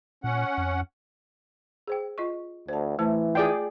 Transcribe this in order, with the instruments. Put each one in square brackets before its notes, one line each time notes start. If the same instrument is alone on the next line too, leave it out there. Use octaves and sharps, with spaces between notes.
[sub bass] A#2 [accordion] C#4 F#5
[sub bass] F2
[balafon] G#4 C5 G5
F4 D#5 C#6
[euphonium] D2 [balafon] C5 A5
[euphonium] E3 [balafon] A3 C5 A5
[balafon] F4 [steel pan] G#4 D5 G5